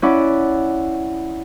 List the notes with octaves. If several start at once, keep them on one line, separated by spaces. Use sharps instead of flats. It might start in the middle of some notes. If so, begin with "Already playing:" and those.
C#4 E4 D5 F#5